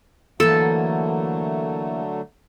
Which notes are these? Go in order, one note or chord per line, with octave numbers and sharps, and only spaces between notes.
D3 E3 F#3 A3 A#3 A4